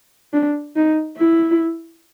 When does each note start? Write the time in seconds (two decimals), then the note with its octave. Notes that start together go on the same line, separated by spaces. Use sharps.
0.33 D4
0.76 D#4
1.18 E4